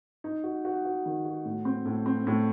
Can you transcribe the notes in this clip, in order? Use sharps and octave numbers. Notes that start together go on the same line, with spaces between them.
D#4
F#4
F#4
F#4
D#3
F#4
A2
C4
A2
C4
A2